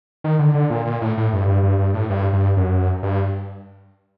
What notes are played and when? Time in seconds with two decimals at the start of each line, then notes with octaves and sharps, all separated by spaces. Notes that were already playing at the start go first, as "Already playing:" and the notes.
0.24 D#3
0.39 D3
0.54 D3
0.70 A#2
0.85 A#2
1.01 A2
1.18 A2
1.33 G2
1.48 G2
1.63 G2
1.79 G2
1.94 A2
2.10 G2
2.33 G2
2.57 F#2
3.03 G2